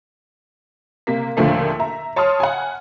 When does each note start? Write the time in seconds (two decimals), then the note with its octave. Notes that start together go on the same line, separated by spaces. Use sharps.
1.07 C3 A#3 B6
1.37 D#2 A#2 D3 F3 A3 A#3
1.79 E5 A#5
2.16 C#5 A5 C6 D#6 F6
2.40 F#5 G#5